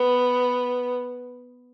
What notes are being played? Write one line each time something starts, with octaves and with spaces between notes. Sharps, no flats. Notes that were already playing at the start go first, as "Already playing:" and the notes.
Already playing: B3